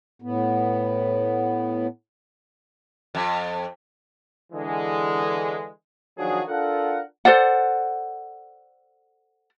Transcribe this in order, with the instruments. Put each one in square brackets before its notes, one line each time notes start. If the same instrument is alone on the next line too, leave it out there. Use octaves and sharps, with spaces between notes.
[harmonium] A2 B3
[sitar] F2
[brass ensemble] D3 E3 G#3
D#3 F3 F#3 D4 F#4 G#4
D4 F4 A4 A#4 F#5
[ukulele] A4 C5 D5 F#5